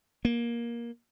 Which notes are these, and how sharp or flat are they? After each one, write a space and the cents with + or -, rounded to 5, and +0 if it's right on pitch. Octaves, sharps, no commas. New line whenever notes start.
A#3 +15